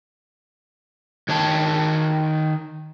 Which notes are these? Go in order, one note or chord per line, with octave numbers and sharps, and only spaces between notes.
D#3 C#5 A5